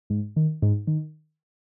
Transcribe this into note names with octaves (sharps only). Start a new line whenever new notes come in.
G#2
D#3
G#2
D#3